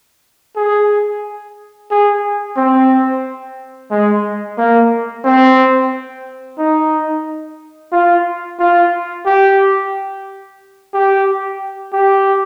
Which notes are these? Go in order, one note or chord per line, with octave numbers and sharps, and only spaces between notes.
G#4
G#4
C4
G#3
A#3
C4
D#4
F4
F4
G4
G4
G4